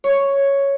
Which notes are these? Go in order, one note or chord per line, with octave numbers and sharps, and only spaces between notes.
C#5